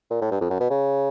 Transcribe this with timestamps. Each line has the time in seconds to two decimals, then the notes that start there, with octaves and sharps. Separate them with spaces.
0.10 A#2
0.21 A2
0.31 G2
0.41 F2
0.50 F#2
0.60 B2
0.70 C#3